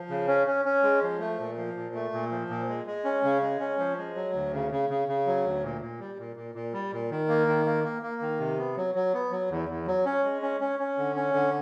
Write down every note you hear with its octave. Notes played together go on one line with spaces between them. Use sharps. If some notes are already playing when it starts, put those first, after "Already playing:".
Already playing: F3
C#3
C#4
C#4
C#4
G#3
F3
A3
A#2
F3
A#2
A3
A#2
F3
A#2
G#3
G#3
C#4
C#3
G#3
C#4
F3
G#3
F#3
D2
C#3
C#3
C#3
C#3
F#3
D2
A#2
A#2
G3
A#2
A#2
A#2
G3
A#2
D#3
A#3
D#3
A#3
A#3
A#3
D#3
C3
B3
F#3
F#3
B3
F#3
E2
E2
F#3
C#4
G#3
C#4
C#4
C#4
D3
C#4
D3